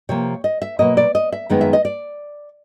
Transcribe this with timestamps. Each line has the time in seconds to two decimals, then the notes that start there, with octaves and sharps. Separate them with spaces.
0.09 C3 F3 A#3 C#5
0.44 D#5
0.62 E5
0.79 B2 F#3 A#3 D#5
0.97 D5
1.15 D#5
1.32 E5
1.50 F#2 D#3 G#3 B3 D#4
1.61 E5
1.73 D#5
1.85 D5